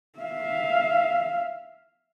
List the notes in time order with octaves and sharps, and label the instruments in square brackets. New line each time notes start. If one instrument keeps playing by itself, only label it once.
[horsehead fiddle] E5 F5